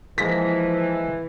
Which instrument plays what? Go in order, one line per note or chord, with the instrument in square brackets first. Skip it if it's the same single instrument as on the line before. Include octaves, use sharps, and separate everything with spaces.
[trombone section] E3 [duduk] F3 [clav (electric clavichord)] G#3 A#3 [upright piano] A#6 B6